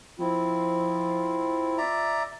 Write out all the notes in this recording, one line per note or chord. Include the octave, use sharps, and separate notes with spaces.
F3 C4 E4 F4
D5 E5 A#5